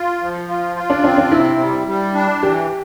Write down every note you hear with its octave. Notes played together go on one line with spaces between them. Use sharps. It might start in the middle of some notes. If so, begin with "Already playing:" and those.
Already playing: F4
F3
F4
F4
D4
C4 D4
D4
C3 E4
G3
G3
D4
E3 G4